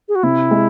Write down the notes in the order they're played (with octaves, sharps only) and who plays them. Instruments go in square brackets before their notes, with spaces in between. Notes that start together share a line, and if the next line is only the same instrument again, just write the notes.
[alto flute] G#4
F#4
[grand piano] C3 [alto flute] E4
[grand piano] G#3